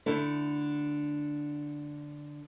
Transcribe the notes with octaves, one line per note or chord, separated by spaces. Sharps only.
D3 A3 E4